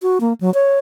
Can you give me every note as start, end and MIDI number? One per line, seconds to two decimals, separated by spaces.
0.02 0.19 66
0.21 0.33 58
0.41 0.53 54
0.54 0.79 73